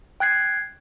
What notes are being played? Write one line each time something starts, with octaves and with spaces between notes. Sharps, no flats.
G5 F#6 G#6 C7